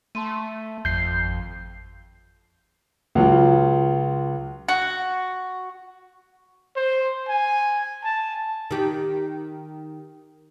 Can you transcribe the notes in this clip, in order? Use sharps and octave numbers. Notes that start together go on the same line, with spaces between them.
A3 A5 C6 D#7
G#1 F2 G6 C7
C#2 F#3 F4
F#4
C5
G#5
A5
D#3 G4